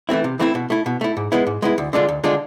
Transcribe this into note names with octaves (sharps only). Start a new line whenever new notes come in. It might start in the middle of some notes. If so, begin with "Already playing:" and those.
E3 A3 C4 E4
C3
E3 A3 C4 E4
B2
A3 E4
B2
A3 E4
G#2
G#3 B3 E4
G#2
G#3 B3 E4
D2
D3 G#3 D4 F4
D2
D3 G#3 D4 F4